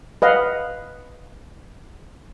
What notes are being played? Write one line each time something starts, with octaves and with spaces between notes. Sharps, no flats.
B4 D#5 F5 F#5